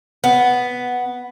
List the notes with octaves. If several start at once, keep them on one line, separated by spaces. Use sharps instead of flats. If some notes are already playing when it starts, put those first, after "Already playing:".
B3